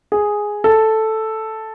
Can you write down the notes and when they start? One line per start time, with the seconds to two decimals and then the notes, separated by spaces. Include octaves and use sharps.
0.12 G#4
0.64 A4